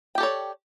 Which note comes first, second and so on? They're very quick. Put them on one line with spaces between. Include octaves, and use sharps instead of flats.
G5 G4 A4 C#5 D5